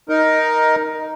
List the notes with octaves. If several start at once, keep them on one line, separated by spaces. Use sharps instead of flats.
D#4 A#4